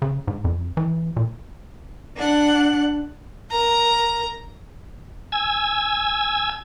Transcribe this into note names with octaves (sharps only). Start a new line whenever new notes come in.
C#3
G#2
F2
E3
A#2
D4 F#5
A#4 A#5
G#5 E6 G#6